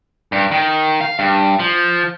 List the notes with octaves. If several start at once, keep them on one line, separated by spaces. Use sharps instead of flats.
G2
D#3
F5
G2
F3